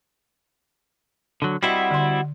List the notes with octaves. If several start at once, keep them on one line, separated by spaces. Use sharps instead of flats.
D3 F#3
G3 C4 E4 F#4 D#5
D3 C6